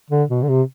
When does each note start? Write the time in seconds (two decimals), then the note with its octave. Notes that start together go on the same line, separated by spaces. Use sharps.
0.10 D3
0.29 B2
0.43 D3
0.49 C3